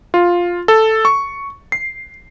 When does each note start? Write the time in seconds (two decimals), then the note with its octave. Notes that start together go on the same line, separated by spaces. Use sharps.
0.14 F4
0.68 A4
1.05 C#6
1.72 C7